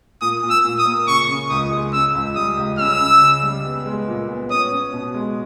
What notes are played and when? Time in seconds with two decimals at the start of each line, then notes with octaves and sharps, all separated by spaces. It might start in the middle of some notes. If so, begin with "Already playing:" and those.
0.21 A#2 D#6
0.43 A#2
0.50 E6
0.64 A#2
0.79 D#6
0.86 A#3
1.07 C#3 C#6
1.29 C#3
1.50 C#2 D#6
1.72 G#3
1.93 C#3 E6
2.15 C#2
2.36 G3 D#6
2.57 C#2
2.79 C#3 E6
3.00 C#3
3.22 C#3
3.43 G3
3.65 B3
3.86 G#3
4.07 A#2
4.29 B3
4.50 C#4 D#6
4.72 C#4
4.93 B2
5.14 G#3